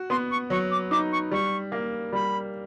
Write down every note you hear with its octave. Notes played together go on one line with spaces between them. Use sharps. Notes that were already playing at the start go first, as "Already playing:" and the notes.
Already playing: F#4
B3 C6
C#6
F#3 C#6
D6
D#4 D6
C#6
G3 C#6
A#3
G3 B5